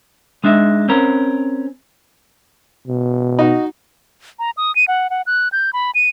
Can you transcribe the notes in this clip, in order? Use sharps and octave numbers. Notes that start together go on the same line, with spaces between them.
G#3 D4 D#4 E5
C4 C#4 A#4
B2
D#4 F#4
A#5
D#6
D#7
F#5
F#5
F#6
G6
B5
D#7